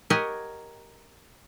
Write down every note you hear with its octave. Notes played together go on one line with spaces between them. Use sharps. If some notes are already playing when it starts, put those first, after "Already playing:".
G4 A#4 C#5 D#5 F#5 G#5